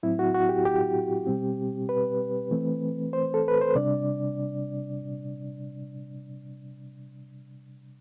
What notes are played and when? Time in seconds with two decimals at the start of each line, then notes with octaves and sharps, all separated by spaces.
0.03 A2 F#3 C4 E4
0.19 F#4
0.34 F#4
0.49 G4
0.65 G4
1.27 B2 G3 C4
1.89 B4
2.51 E3 A3 C4
3.13 C5
3.34 A4
3.48 B4
3.61 C5
3.75 C3 G3 D4 D5